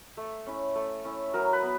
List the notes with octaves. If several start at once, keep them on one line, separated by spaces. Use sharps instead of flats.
A3
C#4 E4
A3
C#4 E4
F#3 A#4
B4
B3